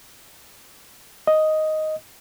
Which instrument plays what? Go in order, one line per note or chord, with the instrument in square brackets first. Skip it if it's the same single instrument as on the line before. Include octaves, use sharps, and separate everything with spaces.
[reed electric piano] D#5